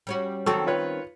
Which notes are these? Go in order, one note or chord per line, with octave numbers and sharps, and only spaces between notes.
G3 C#4 F#4
D#3 F#3 C4 C#4 A4 C#6
F4 B4 C#5